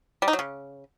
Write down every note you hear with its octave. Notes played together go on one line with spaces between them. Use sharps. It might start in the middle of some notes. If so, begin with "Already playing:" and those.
G3
D#4
F#3
C#3